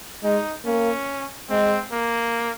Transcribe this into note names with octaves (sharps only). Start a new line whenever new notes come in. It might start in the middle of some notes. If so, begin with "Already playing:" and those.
G#3 D#4
A#3 C#4
G#3 C4
A#3